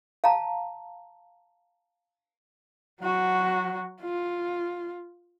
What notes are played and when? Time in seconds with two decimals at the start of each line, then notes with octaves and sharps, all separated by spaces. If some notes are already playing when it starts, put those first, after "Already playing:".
0.24 F5 A5 A#5
3.02 F#3 F#4
4.02 F4